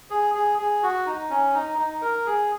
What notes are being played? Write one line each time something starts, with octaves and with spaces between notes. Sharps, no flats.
G#4
G#4
G#4
F#4
D#4
C#4
D#4
D#4
A#4
G#4